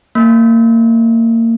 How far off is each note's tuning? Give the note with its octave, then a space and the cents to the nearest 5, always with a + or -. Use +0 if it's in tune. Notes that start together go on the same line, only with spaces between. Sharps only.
A#3 -30